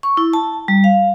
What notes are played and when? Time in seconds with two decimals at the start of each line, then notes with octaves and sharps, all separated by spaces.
0.03 C#6
0.17 E4
0.33 A5
0.68 G3
0.84 F5